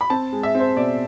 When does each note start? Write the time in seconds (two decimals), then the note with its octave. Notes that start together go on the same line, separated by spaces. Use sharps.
0.01 B5
0.10 C4 A5
0.33 G#3
0.43 E5
0.55 C4
0.60 C5
0.76 B2 D5